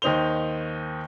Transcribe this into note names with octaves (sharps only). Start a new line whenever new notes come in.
D#2 D#3 D#4 C5 F7 G7